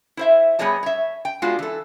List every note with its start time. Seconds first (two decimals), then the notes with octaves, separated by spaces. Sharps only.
0.17 E4 C5 E5
0.59 G3 B3 G#4 C#5 D#5 A5
0.83 C#5 E5
1.25 G5
1.42 G#3 B3 D4 F4 F#4
1.59 E3 A4